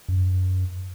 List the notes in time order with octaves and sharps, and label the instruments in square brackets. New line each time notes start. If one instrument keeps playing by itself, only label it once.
[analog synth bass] F#2